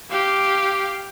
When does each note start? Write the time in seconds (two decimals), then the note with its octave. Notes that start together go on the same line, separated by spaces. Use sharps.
0.10 G4 F5